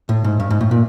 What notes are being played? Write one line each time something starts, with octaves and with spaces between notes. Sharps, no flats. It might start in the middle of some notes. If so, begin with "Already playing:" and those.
A2
G#2
G2
G#2
A2
A#2